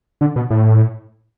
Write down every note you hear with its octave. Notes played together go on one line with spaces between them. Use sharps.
D3
B2
A2